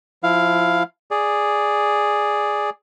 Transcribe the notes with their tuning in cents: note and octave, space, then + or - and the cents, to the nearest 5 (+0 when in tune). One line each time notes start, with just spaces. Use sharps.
F3 +0 E4 +20 F5 +0
G#4 +0 D5 +0